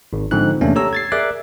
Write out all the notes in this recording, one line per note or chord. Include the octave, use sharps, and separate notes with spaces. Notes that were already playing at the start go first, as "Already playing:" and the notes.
G#1
G#2 D3 F3 C4 D#4 F#6
E2 C3 A3 A#3 C#4 D4
G4 A4 C#5 A#5 E6
G#6 A6 C7
G#4 A#4 D5 E5 D6 F#6